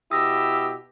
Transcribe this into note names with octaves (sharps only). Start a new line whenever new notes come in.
B2 E4 G4 D#6 E6 A#6